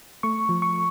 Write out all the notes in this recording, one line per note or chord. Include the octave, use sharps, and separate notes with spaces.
A3 C#6
F3
C#6